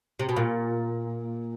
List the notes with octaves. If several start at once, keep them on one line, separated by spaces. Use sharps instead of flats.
C3
B2
A#2